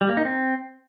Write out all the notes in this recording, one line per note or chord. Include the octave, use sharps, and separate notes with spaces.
G3
A#3
D#4
C4